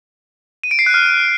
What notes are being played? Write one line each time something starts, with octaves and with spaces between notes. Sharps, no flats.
D#7
D7
C7
F#6
F6